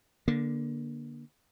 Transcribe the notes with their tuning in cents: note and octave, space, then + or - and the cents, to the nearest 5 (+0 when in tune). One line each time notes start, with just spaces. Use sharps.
D3 +0 A#3 +25